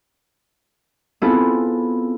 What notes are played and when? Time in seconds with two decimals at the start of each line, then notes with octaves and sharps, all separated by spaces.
1.22 B3 C4 E4 F4 G#4 A4